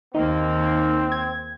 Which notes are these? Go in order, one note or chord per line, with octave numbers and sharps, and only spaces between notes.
D#2 A#3 C4 D#4
G#6